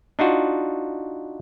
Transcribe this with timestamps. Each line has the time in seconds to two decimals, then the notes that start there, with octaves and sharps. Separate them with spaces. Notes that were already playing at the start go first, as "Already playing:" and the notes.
0.19 D4 D#4 F4 F#4